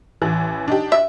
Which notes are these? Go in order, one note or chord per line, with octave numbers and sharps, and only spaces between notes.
A1 E3
D4 D#4 G4
E5